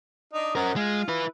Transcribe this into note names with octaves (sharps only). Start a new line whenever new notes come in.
D4 D#4 D#5
C#4 A#4 C5 D#5 F#5
G#3 F4
E4 B4